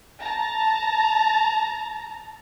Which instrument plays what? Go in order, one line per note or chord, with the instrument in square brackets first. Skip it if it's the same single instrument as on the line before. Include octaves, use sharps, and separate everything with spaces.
[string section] A5 A#5